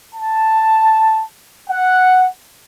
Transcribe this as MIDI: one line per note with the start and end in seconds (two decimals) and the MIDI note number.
0.15 1.23 81
1.69 2.27 78